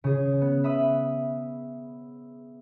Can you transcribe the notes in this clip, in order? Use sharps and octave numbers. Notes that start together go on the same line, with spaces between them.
C#3 G#4
B3
E5 B5 D#6 D#7